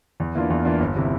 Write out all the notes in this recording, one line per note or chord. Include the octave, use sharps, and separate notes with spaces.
E2
E3 A#3 D4 F4
E2
E3 A#3 D4 F4
G1
C3 E3